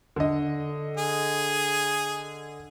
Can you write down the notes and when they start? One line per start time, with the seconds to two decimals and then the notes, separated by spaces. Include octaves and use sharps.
0.16 D3 D#5
0.97 G#4